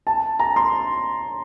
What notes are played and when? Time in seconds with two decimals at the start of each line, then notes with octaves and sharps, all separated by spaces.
0.07 A5
0.39 A#5
0.56 C6